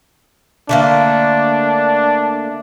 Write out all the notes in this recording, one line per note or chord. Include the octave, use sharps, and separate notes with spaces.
D3 A3 A#3 D4